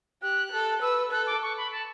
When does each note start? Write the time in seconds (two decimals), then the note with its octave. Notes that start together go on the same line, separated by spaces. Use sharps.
0.22 G4 F#6
0.52 A4
0.82 B4 E6
1.12 A4 F#6
1.27 D6
1.42 C#6
1.57 B5
1.72 A5